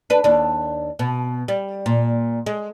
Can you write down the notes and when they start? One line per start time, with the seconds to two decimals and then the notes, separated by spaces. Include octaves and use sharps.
0.10 D4 B4
0.24 D#2 D4
0.99 B2
1.48 G3
1.86 A#2
2.46 G#3